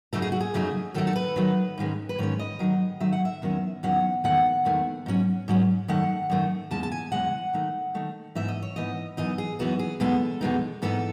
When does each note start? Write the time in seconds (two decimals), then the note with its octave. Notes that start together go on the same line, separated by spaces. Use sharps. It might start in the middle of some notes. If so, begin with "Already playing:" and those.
0.13 F#2 C#3 F#3 A3 D#4 A4
0.22 G#4
0.32 F#4
0.40 G#4
0.54 F#2 C#3 F#3 A3 D#4
0.94 D#3 F#3 A3 D#4 A4
1.07 A4
1.16 B4
1.36 D#3 F#3 A3 D#4
1.78 G#2 D#3 G#3 C#4
2.09 B4
2.18 G#2 D#3 G#3 C#4 C#5
2.39 D#5
2.59 D#3 F#3 A3 D#4
3.00 D#3 F#3 A3 D#4 E5
3.13 F#5
3.25 E5
3.42 E2 D#3 F#3 C#4
3.83 E2 D#3 F#3 C#4 F#5
4.24 E2 D#3 A3 F#5
4.65 E2 D#3 A3
5.06 G#2 F#3 C#4
5.48 G#2 F#3 C#4
5.88 F#2 D#3 A3 F#5
6.30 F#2 D#3 A3
6.71 E2 C#3 G#3 A5
6.83 A5
6.92 G#5
7.12 E2 C#3 G#3 F#5
7.53 D#3 A3 D#4
7.94 D#3 A3 D#4
8.35 G#2 E3 B3 D#4 E5
8.48 D#5
8.62 C#5
8.76 G#2 E3 B3 D#4 D#5
9.17 F#2 E3 B3 D#4 D#5
9.38 G#4
9.59 F#2 E3 B3 D#4 F#4
9.79 G#4
10.00 E2 B2 G#3 B3 D#4 A4
10.41 E2 B2 G#3 B3 D#4
10.82 G#2 E3 B3 D#4 A4